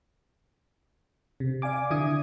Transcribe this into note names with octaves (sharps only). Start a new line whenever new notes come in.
C3
D5 F5 G#5 D6
D3 E4 D#6 G#6